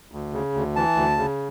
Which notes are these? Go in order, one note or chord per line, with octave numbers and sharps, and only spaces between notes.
D2
C#3
D2
E3 A5
D2
C#3